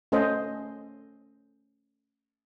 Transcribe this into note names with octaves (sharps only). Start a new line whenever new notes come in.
A3 C#4 A4 C5 D#5